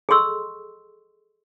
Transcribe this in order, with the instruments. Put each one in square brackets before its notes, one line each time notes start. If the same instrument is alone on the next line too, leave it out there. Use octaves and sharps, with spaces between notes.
[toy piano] G#4 A4 D#5 C6 C#6 E6